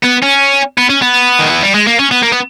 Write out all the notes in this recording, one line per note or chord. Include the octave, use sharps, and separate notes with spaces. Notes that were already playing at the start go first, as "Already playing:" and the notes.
B3
C#4
B3
C#4
B3
D#3
E3
G3
G#3
A#3
C#4
B3
A#3
B3